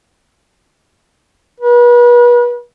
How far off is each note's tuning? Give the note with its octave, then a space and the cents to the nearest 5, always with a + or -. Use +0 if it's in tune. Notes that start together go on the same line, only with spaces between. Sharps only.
B4 -35